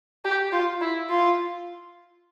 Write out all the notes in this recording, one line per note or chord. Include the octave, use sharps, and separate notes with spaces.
G4
F4
E4
F4